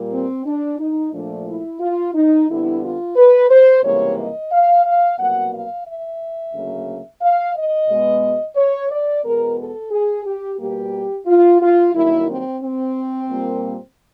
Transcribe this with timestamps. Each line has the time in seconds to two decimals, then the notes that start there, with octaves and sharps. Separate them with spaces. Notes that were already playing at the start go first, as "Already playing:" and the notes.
Already playing: A#2 G3 A#3
0.12 C4
0.46 D4
0.79 D#4
1.13 A#2 F3 A3 D4
1.47 E4
1.80 F4
2.15 D#4
2.48 F2 D3 G3 B3 E4
2.82 F4
3.16 B4
3.50 C5
3.83 C#2 C3 E3 G3 A#3 C#5
4.17 D#5
4.51 F5
4.85 F5
5.18 C2 B2 F#3 A#3 F#5
5.52 F5
5.86 E5
6.53 D2 C#3 F#3 A#3
7.22 F5
7.55 D#5
7.89 B2 G#3 B3
8.56 C#5
8.90 D5
9.24 E2 B2 G#3 B3 A#4
9.58 A4
9.91 G#4
10.25 G4
10.59 B2 G3 A#3 G4
11.26 F4
11.60 F4
11.94 G2 D#3 F#3 A#3 E4
12.28 C4
12.61 C4
13.29 A#2 G3 A#3